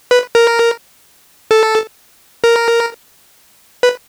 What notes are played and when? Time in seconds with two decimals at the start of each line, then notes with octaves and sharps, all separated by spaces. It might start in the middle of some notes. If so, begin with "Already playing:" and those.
0.11 B4
0.35 A#4
1.51 A4
2.44 A#4
3.83 B4